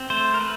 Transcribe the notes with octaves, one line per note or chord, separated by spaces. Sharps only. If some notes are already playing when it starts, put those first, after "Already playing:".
Already playing: C4
A3 C5
A#4
A3 B4